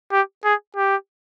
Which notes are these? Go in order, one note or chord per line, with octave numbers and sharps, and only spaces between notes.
G4
G#4
G4